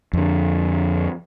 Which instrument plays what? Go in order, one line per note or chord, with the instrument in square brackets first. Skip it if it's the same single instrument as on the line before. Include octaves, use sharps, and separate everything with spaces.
[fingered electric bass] F2 D3